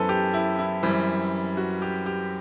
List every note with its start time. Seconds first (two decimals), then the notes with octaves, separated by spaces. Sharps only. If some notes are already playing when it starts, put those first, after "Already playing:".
Already playing: F#2 E3 B3 A4 B4 C5
0.09 G4
0.34 E4
0.59 E4
0.83 F#2 E3 G3 C4
1.57 F#4
1.82 G4
2.06 G4